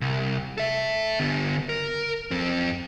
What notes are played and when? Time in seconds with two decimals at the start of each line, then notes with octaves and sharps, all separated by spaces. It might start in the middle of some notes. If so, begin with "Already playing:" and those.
0.01 C2
0.58 A4 E5
1.20 D3 B3
1.69 A#4
2.31 F2 C4